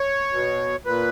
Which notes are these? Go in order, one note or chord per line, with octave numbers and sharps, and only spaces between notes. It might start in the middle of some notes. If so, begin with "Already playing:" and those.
Already playing: C#5
B2
A#2 B4